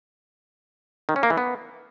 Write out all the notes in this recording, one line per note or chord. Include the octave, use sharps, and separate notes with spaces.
D#3
C#4
A#3
E3
B3